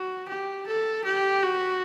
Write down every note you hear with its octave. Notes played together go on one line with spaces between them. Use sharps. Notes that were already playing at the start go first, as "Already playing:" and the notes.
Already playing: F#4
G4
A4
G4
F#4